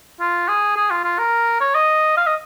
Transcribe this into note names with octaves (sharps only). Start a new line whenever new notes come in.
F4
G#4
G#4
F4
F4
A#4
C#5
D#5
F5
D#5